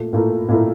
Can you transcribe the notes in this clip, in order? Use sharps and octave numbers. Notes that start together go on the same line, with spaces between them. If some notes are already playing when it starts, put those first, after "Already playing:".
Already playing: A#2 A3
A#2 A3 E4 A#4
A#2 A3 E4 A#4